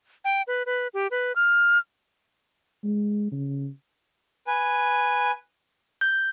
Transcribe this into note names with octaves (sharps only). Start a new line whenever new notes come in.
G5
B4
B4
G4
B4
F6
G#3
C#3
B4 G#5
G6